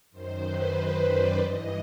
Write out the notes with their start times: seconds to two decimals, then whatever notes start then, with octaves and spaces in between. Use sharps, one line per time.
0.11 F#2 D#3 C5
0.42 B4
0.74 C5
1.06 D5
1.38 G2 E3 D#5